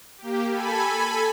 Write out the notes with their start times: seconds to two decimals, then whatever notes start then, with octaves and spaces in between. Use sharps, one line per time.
0.18 A#3 G4
0.50 A4 G#5 B5